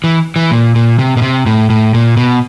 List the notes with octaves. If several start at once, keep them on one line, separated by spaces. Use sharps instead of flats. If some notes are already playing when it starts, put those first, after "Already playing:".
E3
E3
A#2
A#2
C3
B2
C3
A2
A2
A#2
B2